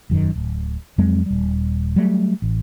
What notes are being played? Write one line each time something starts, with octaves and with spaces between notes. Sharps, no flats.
E1 F#2 D#3
D1
F2 F#3 G#3 C4
D#1 G3
F#3 G3 A3
A1